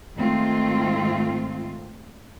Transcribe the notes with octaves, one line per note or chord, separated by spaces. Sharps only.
G#2 D#3 A3 C4 F4